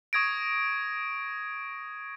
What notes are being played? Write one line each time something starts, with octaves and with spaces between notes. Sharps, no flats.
C#6 D#6 G#6 A#6 D7